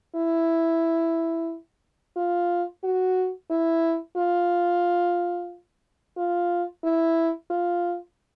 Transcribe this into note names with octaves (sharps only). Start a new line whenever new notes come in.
E4
F4
F#4
E4
F4
F4
E4
F4